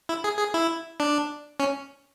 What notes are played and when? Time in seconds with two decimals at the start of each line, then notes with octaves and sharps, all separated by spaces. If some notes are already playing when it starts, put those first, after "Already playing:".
0.09 E4
0.24 G#4
0.39 G#4
0.54 E4
1.00 D4
1.60 C#4